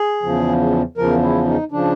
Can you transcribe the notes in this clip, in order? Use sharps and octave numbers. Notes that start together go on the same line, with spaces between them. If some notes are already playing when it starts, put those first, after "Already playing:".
Already playing: G#4
E2 C#3 F3
E2 C#3 F3 A#4
E4
D#4
C#3 F3 D4